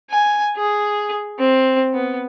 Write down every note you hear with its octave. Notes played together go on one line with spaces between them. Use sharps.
G#5
G#4
C4
B3